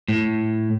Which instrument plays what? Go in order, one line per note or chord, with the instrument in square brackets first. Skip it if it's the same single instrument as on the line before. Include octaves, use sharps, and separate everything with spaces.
[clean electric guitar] A2